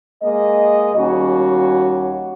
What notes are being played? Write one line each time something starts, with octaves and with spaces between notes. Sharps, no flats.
G#3 A#3 D#5
D#2 G3 C#4 F#4